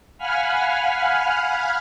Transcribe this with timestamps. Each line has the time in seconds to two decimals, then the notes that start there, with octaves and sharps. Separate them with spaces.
0.18 F5 F#5 G#5 B5 F6